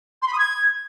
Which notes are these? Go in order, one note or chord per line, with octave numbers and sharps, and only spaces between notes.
C6
B5
D#6
G#6